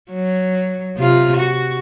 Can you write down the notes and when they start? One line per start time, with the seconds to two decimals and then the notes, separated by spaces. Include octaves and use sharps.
0.11 F#3
0.97 C3 F4
1.37 F#4